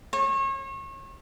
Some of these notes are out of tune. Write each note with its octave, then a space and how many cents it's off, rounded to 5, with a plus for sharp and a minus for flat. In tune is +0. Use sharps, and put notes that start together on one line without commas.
C#5 -35